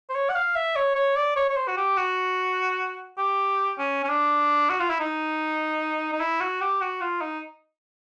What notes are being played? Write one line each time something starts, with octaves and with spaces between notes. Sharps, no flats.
C5
C#5
F#5
F5
E5
C#5
C#5
D5
C#5
C#5
C5
F#4
G4
F#4
G4
C#4
C#4
D4
F#4
F4
E4
D#4
D#4
E4
F#4
G4
F#4
F4
D#4